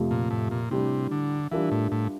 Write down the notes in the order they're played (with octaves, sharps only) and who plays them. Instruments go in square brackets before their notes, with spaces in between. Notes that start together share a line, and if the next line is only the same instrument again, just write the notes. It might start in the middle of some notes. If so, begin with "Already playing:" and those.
Already playing: [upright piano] F2 C3 F3 A3
[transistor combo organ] A#2
A2
A#2
[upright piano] A2 G3 D4 [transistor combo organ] C3
[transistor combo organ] D3
[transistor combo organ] E3 [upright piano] G3 D4 F4 A#4 E5
[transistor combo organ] A2
A2